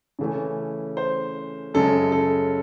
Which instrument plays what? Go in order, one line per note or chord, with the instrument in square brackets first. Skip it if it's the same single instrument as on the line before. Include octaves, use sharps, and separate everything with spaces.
[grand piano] C#3 E3 A3 C#4
C5
F#2 C#3 G#3 A4
A4